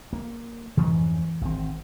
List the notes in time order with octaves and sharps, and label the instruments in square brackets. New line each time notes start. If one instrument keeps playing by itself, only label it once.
[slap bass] A#3
[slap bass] F2 G#2 C#4 [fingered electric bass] E3
[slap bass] G#1 C4